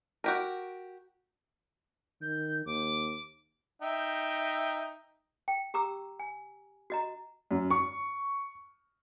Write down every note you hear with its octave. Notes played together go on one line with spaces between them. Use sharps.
F#4 G4 A#4
D#3 G6
D#2 D6
D#4 E5 G5
G5
G4 A#5 D6 E6
G#5
F#4 D#5 A#5
F#2
C#6